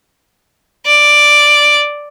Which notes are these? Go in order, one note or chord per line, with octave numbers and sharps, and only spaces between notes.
D5